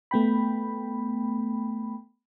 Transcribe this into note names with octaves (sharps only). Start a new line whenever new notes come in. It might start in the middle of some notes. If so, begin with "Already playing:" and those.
A3 B3 G5 B5